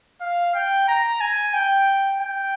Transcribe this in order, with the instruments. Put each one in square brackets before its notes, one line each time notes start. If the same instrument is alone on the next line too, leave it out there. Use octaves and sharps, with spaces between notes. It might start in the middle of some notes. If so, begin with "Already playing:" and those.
[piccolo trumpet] F5
G5
A#5
G#5
G5
G5